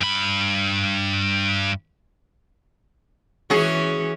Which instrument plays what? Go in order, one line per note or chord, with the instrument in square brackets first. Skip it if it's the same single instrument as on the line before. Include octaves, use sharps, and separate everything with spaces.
[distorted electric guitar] G2 B5
[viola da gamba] E3 C#4 [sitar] F#4 G#4